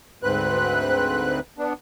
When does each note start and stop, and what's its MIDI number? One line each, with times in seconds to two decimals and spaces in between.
0.23 1.40 38
0.23 1.40 44
0.23 1.40 60
0.23 1.40 71
0.23 1.40 90
1.58 1.73 59
1.58 1.73 62